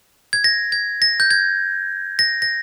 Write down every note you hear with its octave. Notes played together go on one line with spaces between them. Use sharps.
G#6
A#6
G#6
A#6
G6
G#6
A#6
A#6